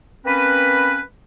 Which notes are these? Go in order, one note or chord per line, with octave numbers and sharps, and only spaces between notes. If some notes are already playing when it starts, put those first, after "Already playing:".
A#3 C4 C#4 B4